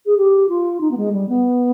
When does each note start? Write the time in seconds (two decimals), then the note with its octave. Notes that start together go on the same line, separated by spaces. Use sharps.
0.06 G#4
0.17 G4
0.49 F4
0.80 D#4
0.91 B3
0.97 G#3
1.13 G3
1.28 B3